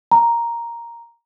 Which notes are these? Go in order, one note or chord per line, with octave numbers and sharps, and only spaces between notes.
A#5